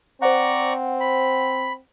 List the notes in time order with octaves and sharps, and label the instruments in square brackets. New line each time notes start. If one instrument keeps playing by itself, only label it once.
[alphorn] C4 [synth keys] C5 F#5 [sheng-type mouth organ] D5 A#5 C#6
[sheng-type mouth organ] B5